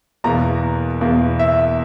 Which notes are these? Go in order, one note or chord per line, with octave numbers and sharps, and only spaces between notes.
E2 B2 A#3 A#5
E2 B2 A#3
E5